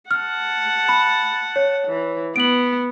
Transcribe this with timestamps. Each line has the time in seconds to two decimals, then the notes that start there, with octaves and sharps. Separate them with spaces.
0.11 F#5 A5 F6
0.89 B5
1.56 C#5
1.87 E3
2.36 B3 D7 F#7